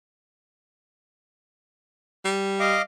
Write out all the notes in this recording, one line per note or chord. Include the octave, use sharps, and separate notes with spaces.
G3
D#5 F5 D6